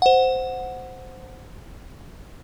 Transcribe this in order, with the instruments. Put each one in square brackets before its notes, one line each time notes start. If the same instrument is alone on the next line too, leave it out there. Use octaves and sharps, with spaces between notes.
[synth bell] C5 F#5